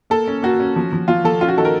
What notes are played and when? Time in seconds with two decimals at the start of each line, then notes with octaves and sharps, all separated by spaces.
0.10 A#3 A4
0.28 C#4
0.43 A#3 F#4
0.60 C#4
0.76 F3
0.93 F3
1.08 F3 F4
1.24 F3 A4
1.41 C#4 F4
1.48 F#4
1.57 D#3 A4
1.65 A#4